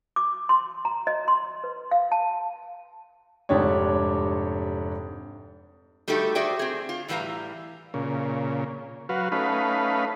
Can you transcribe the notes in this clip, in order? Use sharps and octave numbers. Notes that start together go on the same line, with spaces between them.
D6
C6
A#5
D#5
C6
B4
F5
A5
F1 G#2 D4 G4 C#5
G3 A3 D#4 F#4 G4 A4
F#4 G#4 C5 D5 E5 G5
C4 G#4
F4
A2 E3 G3 B4 F5 A#5
A#2 C#3
F#3 F#4 B4 F5
A3 C#4 D#4 B4 F5 B5